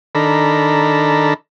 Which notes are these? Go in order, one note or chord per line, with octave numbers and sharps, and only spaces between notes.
D#3 D4 A4 A#5 B5